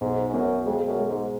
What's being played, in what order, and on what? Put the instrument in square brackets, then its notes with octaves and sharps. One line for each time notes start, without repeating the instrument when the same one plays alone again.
[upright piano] B1 [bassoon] G#2
[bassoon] G#2
[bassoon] F#2 [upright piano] B2
[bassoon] F2 [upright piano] G#3
[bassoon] F#2
[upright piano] G#3
[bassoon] G#2